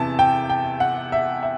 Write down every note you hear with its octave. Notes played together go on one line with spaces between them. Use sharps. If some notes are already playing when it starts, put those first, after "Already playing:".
Already playing: E2 C3 E3 A5
G5
G5
F#5
E5
E5